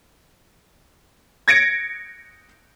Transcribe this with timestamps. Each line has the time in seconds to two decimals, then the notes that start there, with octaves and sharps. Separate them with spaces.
1.48 G#6 A#6 C#7 D7